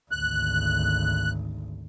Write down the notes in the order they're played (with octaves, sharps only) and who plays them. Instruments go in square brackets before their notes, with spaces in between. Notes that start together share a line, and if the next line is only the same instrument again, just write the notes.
[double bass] G#1 D2 [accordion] F#6